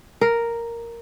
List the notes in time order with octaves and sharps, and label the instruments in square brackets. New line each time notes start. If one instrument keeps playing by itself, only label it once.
[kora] A#4